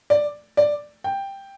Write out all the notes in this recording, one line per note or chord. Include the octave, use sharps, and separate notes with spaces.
D5
D5
G5